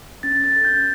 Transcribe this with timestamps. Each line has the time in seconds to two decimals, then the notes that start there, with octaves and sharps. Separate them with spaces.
0.23 C#4 A6
0.44 A4 A6
0.64 C#4 G6